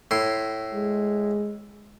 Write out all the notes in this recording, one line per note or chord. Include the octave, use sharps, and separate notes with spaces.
A2 C6
G#3